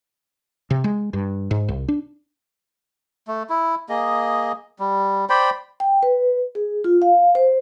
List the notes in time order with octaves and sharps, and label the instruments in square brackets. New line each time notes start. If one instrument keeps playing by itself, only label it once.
[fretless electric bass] C3
G#3
G2
G#2
C2
D4
[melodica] A3
E4
A#3 G#4 D#5
G3
C5 D5 G5 B5
[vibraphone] G5
B4
G#4
F4
F5
C5